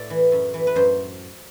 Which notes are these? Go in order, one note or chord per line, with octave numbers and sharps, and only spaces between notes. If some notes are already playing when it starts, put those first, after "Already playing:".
Already playing: A2 D5
E3
F#2
E3
B4
F#2 C5